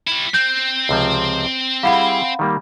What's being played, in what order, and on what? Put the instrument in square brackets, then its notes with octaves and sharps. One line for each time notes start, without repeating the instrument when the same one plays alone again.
[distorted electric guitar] G3 E4
[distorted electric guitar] C4 [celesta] G6
[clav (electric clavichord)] C#2 C3 F3
[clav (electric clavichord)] G3 E4 G#4 [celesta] F5 F#5 B5
[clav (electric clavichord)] D#3 G3 A#3